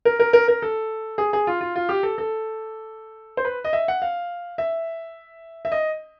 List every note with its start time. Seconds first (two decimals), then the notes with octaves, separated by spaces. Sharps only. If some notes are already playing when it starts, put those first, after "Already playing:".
0.05 A#4
0.20 A#4
0.33 A#4
0.48 A#4
0.62 A4
1.18 G#4
1.33 G#4
1.47 F4
1.61 F4
1.76 F4
1.89 G4
2.03 A4
2.18 A4
3.37 C5
3.45 B4
3.65 D#5
3.73 E5
3.88 F#5
4.02 F5
4.58 E5
5.65 E5
5.72 D#5